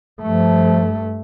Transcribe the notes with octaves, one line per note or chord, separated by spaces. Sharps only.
G2 F3 A3